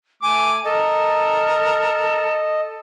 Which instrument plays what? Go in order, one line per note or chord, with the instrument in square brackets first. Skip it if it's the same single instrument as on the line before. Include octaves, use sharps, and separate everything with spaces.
[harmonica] A3 D6 [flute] G#5
[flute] A4 [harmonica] A#4 [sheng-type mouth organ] D#5